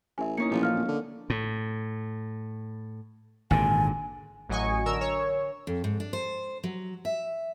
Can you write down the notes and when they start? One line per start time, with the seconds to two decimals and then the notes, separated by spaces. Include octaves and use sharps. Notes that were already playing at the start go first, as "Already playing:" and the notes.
0.18 A1 E5 G#5
0.38 A#3 C#4 D#4 E4 C#7
0.51 A1 A#2 F3
0.63 F5 F6
0.75 D1
0.88 D3
1.30 A2
3.51 G#1 A#2 D3 G#5
4.49 A1 F#3 D#5 G#5 C#6
4.85 D3 A#4 E6
5.01 C#5
5.67 F2
5.84 G#2
6.00 D4
6.13 C5
6.64 F#3
7.05 E5